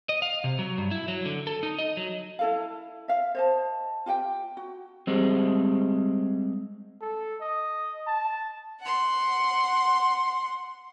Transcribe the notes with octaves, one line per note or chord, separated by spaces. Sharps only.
D#5
F5
C3
F#3
G2
E4
F#3
D3
A4
D#4
D#5
F#3
E4 A4 F5
E5 F5
C5 D#5 A5
F4 G4 F#5 G5
F#4
G3 G#3 C4
A4
D#5
A5
F#5 C6